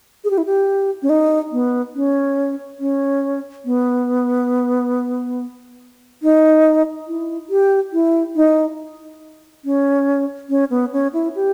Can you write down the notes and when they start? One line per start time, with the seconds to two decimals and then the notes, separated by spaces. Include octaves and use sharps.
0.24 G#4
0.30 G4
0.38 E4
0.45 G4
1.02 C#4
1.09 D#4
1.52 B3
1.95 C#4
2.80 C#4
3.65 B3
6.22 D#4
7.07 E4
7.50 G4
7.93 E4
8.36 D#4
9.64 C#4
10.49 C#4
10.70 B3
10.93 C#4
11.13 E4
11.35 G4